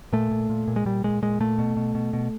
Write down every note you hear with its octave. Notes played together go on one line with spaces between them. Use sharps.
A#2 A3
A#2
A#2
A#2
G#3
A#2 G3
A#2 G#3
A#2 G#3
A#2 A3
B2
B2
B2
B2